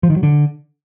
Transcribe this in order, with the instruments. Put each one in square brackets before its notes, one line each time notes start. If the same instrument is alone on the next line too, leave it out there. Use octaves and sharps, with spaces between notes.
[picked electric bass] F3
D#3
F#3
D3